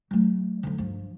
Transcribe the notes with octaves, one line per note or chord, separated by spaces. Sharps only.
F#3 A3
D3 F3
G2 F3